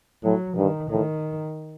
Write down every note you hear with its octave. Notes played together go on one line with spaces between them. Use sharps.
A2 F#3
G2 D#3
A2 D#3